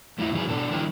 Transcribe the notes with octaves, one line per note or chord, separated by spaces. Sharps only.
E2 A3 E4 D#5 E5
D#3 E3 F#3 E4 G#4
B2 D4 A4
D#3 G3 D4 E4 A#4